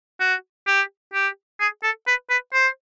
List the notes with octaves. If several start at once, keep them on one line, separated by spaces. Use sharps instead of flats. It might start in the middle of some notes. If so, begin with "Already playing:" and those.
F#4
G4
G4
G#4
A4
B4
B4
C5